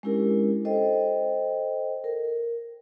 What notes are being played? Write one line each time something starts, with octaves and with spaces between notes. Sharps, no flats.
G#3 C#4 D4 E4 G4 A#4
A4 C5 D#5 G5
A#4